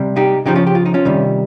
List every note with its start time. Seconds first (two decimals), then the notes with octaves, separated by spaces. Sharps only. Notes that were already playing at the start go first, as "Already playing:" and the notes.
Already playing: C3 G3
0.16 D#4 G4
0.46 C#3 F3 D#4 G4
0.56 C#4 F4
0.67 G4
0.75 F4
0.86 D#4
0.94 C#4 F4
1.05 C3 D#3 G3